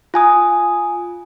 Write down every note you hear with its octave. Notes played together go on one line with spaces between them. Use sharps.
F4 G#5 D#6